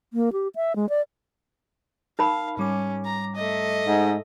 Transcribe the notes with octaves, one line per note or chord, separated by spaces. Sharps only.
A#3
G4
E5
G#3
D5
D#4 A#4 F5 B5
G#2 G3 C#4 D6
A#5
A3 D#5
G#2